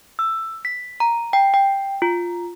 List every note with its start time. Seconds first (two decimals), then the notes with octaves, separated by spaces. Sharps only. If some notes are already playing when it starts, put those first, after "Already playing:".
0.19 E6
0.65 B6
1.00 A#5
1.33 G5
1.54 G5
2.02 F4